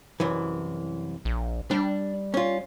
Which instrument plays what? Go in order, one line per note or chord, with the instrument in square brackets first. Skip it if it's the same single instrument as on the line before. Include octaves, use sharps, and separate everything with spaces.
[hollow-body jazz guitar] C2 F#2 E3
[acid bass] A#1
[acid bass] G3 [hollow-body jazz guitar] D4
[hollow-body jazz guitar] C#4 F4